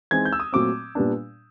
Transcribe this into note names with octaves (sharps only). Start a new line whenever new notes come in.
E3 G#3 C4 D#4 G#6
G6
E6
D#6
A#2 F#3 A3 C4 D6
A#2 G3 B3 D4